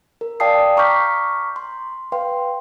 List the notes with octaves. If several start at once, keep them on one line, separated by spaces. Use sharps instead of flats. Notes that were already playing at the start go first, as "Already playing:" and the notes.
A#4
D5 F5 G5 A5 D#6 C7
A#5 C#6 D6 F6 G6 B6
C6
B4 F5 G5 C6